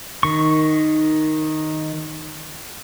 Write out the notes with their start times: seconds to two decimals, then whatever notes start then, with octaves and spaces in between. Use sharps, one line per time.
0.23 D#3 C#6